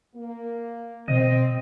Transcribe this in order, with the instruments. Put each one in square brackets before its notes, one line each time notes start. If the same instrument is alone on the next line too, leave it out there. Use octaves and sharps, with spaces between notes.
[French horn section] A#3
[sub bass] B2 [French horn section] C4 [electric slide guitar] D#5